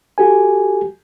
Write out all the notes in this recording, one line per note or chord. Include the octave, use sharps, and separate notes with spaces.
F#4 G4 A4 G#5